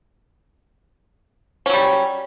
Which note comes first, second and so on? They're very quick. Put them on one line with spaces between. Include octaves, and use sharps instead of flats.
C#4 F#3 G3